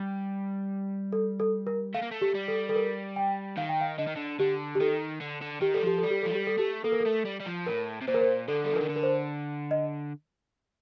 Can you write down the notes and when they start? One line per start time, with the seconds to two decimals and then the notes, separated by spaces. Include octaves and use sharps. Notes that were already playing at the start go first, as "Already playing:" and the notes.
Already playing: G3
1.13 A4
1.40 A4
1.67 A#4
1.94 A3 F5
2.02 A#3
2.11 A3
2.21 G4
2.35 G3
2.48 A4
2.69 A4
2.76 A#4
3.16 G5
3.57 D#3 F5
3.69 G5
3.81 F5
3.98 D3 D#5
4.07 D#3
4.16 D3
4.39 D3 G4
4.75 G4
4.80 D#3 A4
5.21 D3
5.42 D3
5.61 D#3 G4
5.74 G3 A4
5.83 F3 G4
5.98 G3 A4
6.10 G4
6.23 F3 A4
6.30 G3 G4
6.47 A4
6.58 A3 G4
6.84 A#3 A4
6.92 A#4
7.00 A4
7.06 A3
7.25 G3
7.40 G3
7.46 F3
7.67 A2 A#4
8.01 C3
8.07 A#2 C5
8.14 A#4
8.21 C5
8.48 D3 A4
8.64 G3 A4
8.73 F3
8.76 A#4
8.81 D#3
8.89 D3
8.96 A#4
9.03 C5
9.71 D#5